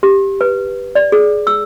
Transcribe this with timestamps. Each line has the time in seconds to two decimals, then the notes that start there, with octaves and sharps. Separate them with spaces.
0.03 G4
0.41 B4
0.95 D5
1.12 G#4
1.47 E6